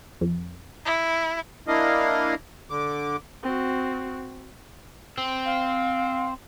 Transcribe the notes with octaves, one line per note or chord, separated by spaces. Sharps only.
F2
E4
A#3 D4 E4 D#5 F5
D3 D6
C4 F#4
C4
F5